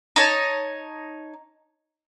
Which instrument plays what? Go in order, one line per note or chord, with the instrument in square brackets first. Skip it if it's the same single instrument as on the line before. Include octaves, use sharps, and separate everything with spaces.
[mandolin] D#4 C#5 A5